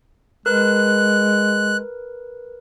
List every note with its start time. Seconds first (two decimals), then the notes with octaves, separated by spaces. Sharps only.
0.46 G#3 A#4 B4 F#6